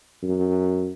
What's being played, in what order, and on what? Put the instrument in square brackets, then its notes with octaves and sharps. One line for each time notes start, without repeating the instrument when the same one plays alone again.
[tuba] F#2